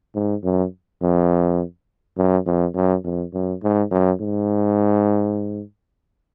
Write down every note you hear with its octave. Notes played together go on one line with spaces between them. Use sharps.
G#2
F#2
F2
F#2
F2
F#2
F2
F#2
G#2
F#2
G#2